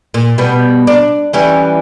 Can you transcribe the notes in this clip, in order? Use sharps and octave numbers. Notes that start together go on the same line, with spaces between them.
A#2
B2 G3 B3
D4
E3 G3 C#4